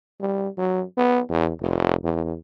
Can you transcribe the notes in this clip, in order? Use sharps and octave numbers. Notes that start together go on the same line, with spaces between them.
G3
F#3
B3
E2
F1
E2